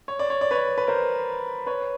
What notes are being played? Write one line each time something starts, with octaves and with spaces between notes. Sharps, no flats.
C#5
D5
C#5
D5
B4 C#5
B4
A#4 C5
B4 C#5